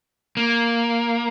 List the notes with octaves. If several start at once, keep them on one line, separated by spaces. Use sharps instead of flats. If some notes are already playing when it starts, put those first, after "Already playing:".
A#3